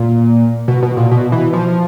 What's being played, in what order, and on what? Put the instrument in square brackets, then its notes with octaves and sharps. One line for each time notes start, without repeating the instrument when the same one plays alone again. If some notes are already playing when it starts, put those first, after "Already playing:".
Already playing: [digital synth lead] A#2
B2
B2
A#2
B2
E3
F3